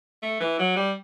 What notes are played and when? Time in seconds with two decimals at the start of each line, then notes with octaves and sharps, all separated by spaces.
0.22 A3
0.40 E3
0.59 F#3
0.76 G3